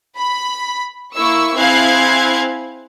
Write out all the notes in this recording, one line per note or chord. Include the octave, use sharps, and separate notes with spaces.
B5
A#3 E4 C#6 E6
C4 E4 G#4 F5 F#6 G#6